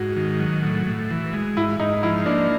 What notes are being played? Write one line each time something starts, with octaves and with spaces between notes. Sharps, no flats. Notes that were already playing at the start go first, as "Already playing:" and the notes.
Already playing: G#2 F#4
D#3
F#3
A2
A2
E3
G#3
G#2 E4
G#2 D#4
F3 E4
A#3 D4